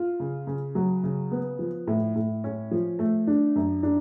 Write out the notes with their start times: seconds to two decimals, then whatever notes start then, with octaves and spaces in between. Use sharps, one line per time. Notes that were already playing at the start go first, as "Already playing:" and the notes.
Already playing: F4
0.20 C#3
0.47 C#3
0.75 F#3
1.04 C#3
1.31 B3
1.59 F3
1.87 A2
2.16 A2
2.44 C#4
2.71 F3
2.99 A3
3.27 D4
3.56 F#2
3.83 D4